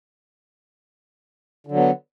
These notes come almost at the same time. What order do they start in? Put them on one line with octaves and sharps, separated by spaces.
D3 F#3 B3